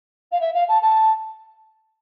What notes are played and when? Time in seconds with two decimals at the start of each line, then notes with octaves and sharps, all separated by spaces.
0.32 F5
0.40 E5
0.54 F5
0.68 A5
0.82 A5